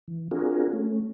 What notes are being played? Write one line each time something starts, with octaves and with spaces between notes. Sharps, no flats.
E3
C4 D4 F4 F#4 G#4 A#4
A3 C#4